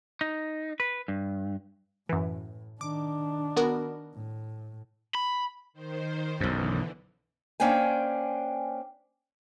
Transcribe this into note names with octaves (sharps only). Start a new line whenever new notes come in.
D#4
B4
G2
F#2 A2 E3
D#3 D4 D6
B3 F#4 A#4
A2
B5
D#3 C5
B1 F#2 D3 E3
A#3 C#4 D4 C5 G5 G#5